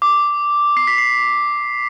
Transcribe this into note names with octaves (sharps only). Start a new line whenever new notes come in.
D6
C7
B6
C7